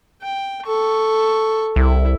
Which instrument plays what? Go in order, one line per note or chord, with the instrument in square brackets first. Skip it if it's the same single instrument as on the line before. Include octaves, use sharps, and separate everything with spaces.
[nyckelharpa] G5
A4 C#6
[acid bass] C2 [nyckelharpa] E4